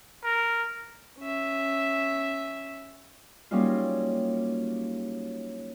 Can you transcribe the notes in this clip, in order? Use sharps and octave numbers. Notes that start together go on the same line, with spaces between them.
A#4
C#4 E5
F#3 G3 A#3 C#4 D#4 F4